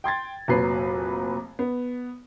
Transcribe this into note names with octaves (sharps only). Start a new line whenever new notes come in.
G5 C6 G#6 A6
F1 A#2 F#3 B4 C7
B3